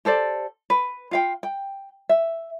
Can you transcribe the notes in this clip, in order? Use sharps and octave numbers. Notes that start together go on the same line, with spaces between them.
G4 A4 C5 D5
B4
F4 F5 G5
G5
E5